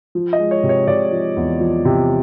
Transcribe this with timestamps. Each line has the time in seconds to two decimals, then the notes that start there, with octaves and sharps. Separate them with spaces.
0.15 F3
0.33 D#5
0.39 G#3
0.51 C#5
0.63 C3
0.69 C#5
0.87 C3 D5
1.12 F3
1.37 E2
1.60 F3
1.85 C3